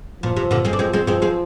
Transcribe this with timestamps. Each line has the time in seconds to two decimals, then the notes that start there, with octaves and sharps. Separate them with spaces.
0.23 A#2 F3
0.36 C3
0.51 A#2 D3
0.65 G#3 C4
0.73 D4
0.79 F3 G#3 C4
0.93 G#3 C4
1.07 F3 G#3 C4
1.22 G#3 C4